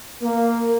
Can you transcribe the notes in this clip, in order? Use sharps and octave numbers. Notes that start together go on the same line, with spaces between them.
A#3